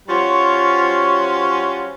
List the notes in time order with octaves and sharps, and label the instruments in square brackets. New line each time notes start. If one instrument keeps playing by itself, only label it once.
[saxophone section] G3 C#4 F4 F#4 C5 C#5